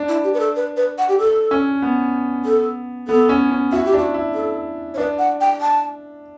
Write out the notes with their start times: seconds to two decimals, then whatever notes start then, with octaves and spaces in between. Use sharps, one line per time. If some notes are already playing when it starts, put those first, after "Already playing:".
Already playing: D4
0.08 E4
0.24 G4
0.34 B4
0.40 A4
0.56 B4
0.77 B4
0.98 F#5
1.09 G4
1.19 A4
1.51 C#4
1.82 B3
2.45 A4
3.08 B3 A4
3.29 C#4
3.51 C#4
3.72 E4 F#4
3.85 G4
3.93 D4 F#4
4.14 E4
4.34 A4
4.94 C#5
4.98 D4 B4
5.19 F#5
5.41 G5
5.61 A5